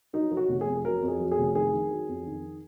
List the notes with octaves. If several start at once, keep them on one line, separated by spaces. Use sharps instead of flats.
F#3 D#4
F#3
F#4
F1
G#4
F2
F#3 A#4
F2
G#4
F#3
G#4
F1
D#3 G#4
D#3
F#3
F2
D#3